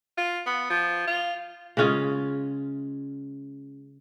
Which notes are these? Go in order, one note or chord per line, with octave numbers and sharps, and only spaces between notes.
F4
B3
F3
F4
C#3 G#3 C#4 F4